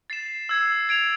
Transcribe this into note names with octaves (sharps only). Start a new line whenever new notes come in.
A6 C7 E7
E6 G#6 C7
G#6 D7 F7